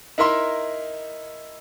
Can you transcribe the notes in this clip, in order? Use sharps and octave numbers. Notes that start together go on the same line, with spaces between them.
D#4 E4 A#4 E5 C6